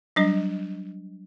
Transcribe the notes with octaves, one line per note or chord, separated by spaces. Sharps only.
F#3 G3 D4 D#5